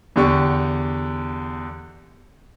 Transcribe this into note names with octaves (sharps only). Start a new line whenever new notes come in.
E2 D3 G4 C#6